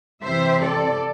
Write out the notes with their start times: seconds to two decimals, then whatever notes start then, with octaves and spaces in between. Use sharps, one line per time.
0.22 C3 E3 C4 C5 E5
0.61 A4 D5